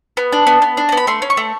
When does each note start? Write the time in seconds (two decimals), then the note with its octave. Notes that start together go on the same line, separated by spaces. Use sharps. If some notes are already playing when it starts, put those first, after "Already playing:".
0.17 B3
0.32 D4
0.47 B3
0.62 B3
0.77 D4
0.89 A#5
0.92 B3
0.97 B5
1.07 A3 C6
1.22 C#4
1.30 C#6
1.37 A3